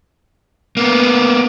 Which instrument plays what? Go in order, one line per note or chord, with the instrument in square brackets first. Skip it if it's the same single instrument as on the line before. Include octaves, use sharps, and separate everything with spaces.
[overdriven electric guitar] A#3 B3